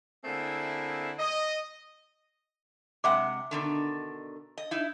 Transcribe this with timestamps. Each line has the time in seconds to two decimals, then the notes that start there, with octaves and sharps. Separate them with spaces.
0.25 D3 A3 A#3 C4 E4 G#4
1.19 D#5
3.04 C3 G#3 E5 F#5 D6
3.51 B2 D3 D#3
4.58 D#5
4.71 D#4 E4